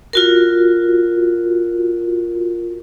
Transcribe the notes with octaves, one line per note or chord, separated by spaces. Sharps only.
F4 F#4 A#4